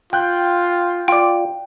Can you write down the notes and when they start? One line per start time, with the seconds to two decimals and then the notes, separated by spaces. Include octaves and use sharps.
0.13 F4 G5 F#6 G6
1.08 F4 D5 G5